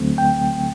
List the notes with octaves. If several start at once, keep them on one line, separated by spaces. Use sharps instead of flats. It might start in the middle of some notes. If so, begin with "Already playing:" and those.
Already playing: D2 D3 F#3 A3 C4
G5